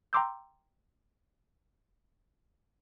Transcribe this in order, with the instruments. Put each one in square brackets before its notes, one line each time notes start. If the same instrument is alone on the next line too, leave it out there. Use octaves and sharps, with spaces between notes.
[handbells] G5 A#5 C6 D6 E6 G6